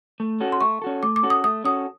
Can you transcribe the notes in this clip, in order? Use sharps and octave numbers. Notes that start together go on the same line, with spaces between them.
A3
C#4 F#4 A4
C6
A3 C#6
C#4 F#4 A4
A3 D6
D6
C#4 F#4 A4
D#6
A3 D#6
C#4 F#4 A4 D#6